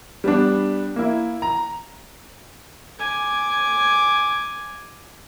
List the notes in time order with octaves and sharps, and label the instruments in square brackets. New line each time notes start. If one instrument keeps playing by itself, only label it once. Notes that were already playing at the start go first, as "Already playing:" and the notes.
[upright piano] G3 B3 D4
A#3 E4
A#5
[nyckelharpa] G#5 D6